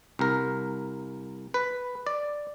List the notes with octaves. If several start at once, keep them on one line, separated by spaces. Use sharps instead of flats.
C2 A#4
B4
D5